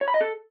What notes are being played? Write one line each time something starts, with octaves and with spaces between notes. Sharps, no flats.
C#5
B5
D#5
A4